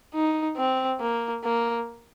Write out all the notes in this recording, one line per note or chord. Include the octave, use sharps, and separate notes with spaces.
D#4
C4
A#3
A#3